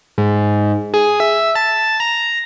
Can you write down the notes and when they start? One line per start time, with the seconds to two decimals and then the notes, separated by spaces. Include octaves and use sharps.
0.18 G#2
0.94 G#4
1.20 E5
1.55 A5
2.00 A#5